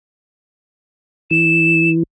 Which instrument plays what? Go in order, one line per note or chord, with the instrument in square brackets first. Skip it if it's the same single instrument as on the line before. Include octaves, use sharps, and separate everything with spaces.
[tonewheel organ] E3 [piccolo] E7